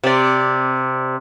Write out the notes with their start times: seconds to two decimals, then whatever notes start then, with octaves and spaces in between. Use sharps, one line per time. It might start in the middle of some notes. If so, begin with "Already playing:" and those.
0.04 C3 D5